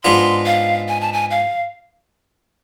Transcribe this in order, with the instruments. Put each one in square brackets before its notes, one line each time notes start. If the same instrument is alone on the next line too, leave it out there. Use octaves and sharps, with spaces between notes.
[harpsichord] G#2 G#3 B3 D4 F4 [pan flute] C6
[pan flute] F5
G#5
A5
G#5
F5